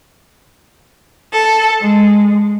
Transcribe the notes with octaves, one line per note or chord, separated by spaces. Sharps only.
A4
G#3